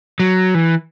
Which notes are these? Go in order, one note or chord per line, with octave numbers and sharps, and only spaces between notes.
F#3
E3